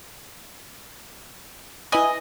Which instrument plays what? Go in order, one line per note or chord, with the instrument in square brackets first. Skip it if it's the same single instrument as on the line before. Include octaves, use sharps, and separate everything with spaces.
[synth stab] E4 B4 G#5 [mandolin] D#5